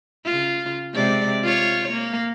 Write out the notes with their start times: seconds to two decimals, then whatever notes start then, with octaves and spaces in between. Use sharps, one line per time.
0.25 C#3 F4
0.94 C3 G#3 D5
1.43 F4 C#5
1.91 A#3